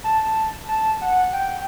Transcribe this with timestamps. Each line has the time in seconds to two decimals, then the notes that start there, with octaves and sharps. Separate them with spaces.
0.04 A5
0.68 A5
1.01 F#5
1.33 G5